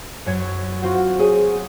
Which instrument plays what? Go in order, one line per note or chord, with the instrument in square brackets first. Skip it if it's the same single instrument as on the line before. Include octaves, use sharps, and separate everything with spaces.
[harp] F#2 C#5 G#6
[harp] C4 F4 [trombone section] F#4
[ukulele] G#4 C#5 [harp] D#6